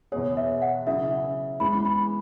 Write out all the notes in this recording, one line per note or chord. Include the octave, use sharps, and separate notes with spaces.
E2 B2 B3 G#4 C#5
E5
F#5
C#3 F#3 E4 G#4 E5
E2 E3 G#3 C#4 B5
B5